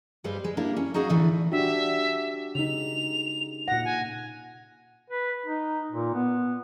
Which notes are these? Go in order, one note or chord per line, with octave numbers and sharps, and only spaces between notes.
G2 G3 G#3 B4 C5
G#3
A#3 D4 E4 G4 A#4
C#4
D#4 F#4 G#4 D#5 F5
D2 A2 E3 A3 D4
D4 F#4 G4 E5
C#3 D#4 F7
A#2 F#5 A#6
G#5
B4
D#4
A#2
B3